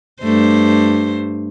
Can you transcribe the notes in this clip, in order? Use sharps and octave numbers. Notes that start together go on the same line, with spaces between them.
G2 A3 C5